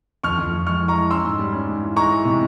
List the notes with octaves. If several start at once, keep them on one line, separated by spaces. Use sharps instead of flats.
F2 C#6 F6
F2
F2
G#3 C#6 F6
E3
A#5 C#6
G#3
C#4 C6 E6
G#2
G3
C#4
G#2
E3
G#3 A#5 C#6
E3
C3